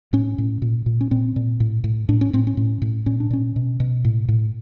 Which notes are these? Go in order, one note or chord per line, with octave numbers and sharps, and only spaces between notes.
A2 C#4
A2
A#2
A#2
C#4
A#2 C4
A#2
A2
A2
A2 D4
C#4
A2 C4
C#4
A2
A2
A#2 C#4
D4
A#2 C#4
B2
B2
A2
A2